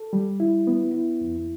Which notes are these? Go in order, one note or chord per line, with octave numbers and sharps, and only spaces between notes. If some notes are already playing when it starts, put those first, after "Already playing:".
Already playing: A4
G3
E4
B3
E4
F2